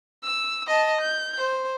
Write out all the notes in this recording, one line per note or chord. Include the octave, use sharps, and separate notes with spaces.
E6
D#5 A5
G6
C5